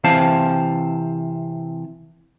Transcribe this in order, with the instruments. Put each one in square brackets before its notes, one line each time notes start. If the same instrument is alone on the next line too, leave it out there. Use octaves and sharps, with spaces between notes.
[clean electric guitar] C3 E3 C4 C5 F5 A5